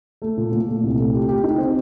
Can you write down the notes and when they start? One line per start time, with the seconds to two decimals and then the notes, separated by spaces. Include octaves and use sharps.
0.22 A3
0.37 A#2
0.52 A#2
0.68 A3
0.83 C2
0.98 A3
1.13 G4
1.28 G4
1.44 D#4
1.58 C4